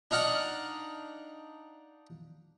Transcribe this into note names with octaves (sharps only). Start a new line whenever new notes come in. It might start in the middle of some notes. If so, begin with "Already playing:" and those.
D4 D#4 F5 F#5 A5